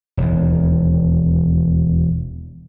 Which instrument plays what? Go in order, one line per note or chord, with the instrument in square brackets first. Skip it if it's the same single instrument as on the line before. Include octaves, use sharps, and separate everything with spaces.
[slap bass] E1 D#2